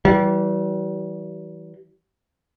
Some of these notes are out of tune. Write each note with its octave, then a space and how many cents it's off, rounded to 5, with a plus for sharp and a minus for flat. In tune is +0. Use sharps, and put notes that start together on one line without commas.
E3 -10 G3 -35